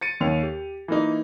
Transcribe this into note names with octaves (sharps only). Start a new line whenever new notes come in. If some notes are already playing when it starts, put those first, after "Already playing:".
A6 C#7 D#7
D#2 C#5 F7
G4
E3 A#3 D#4